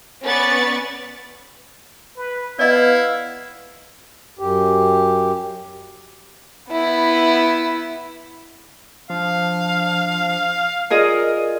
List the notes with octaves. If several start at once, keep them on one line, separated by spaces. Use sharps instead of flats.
B3 C#4 B4 D5 C#6 A6
B4
B3 E4 D5 D#5 F5
F#2 G4
B3 E4
F3 D4 F5
F4 G#4 A#4 D5 D#5